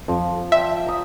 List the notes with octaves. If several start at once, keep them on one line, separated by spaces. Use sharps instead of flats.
F2 F3
C5 D5 E5 G5
A#5 D#6